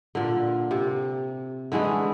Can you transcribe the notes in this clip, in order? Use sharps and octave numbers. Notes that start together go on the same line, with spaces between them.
A#2 D3
C3
D3 E3 G#3 A3